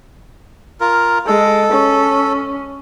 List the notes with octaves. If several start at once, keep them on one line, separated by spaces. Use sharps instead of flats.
F4 A#4
G#3 A4
C#4